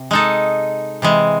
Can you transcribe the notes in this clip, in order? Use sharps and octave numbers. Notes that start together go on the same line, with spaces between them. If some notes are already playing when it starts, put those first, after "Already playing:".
Already playing: C3
G#3 D#4 A4
C3 E3 G#3